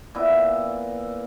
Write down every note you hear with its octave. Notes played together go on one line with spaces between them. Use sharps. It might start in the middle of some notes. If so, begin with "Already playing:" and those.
A#2 B3 E4